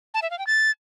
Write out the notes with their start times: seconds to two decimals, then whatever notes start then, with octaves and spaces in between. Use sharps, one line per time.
0.14 A5
0.22 E5
0.30 F5
0.39 G5
0.47 A6